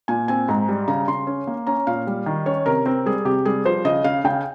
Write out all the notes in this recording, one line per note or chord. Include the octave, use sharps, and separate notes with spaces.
A#2 G#5
C4 G#5
G#2 A#5
G3
C#3 A#5
C#3 C6
C#4
A#3
C#4 A#5
A#2 F5
G3
D#3
C#4 C#5
C3 A#4
C4 A#4
G3 G#4
C3 G4
G3 G#4
F3 C5
C#3 D#5
C#3 F5
C#3 G5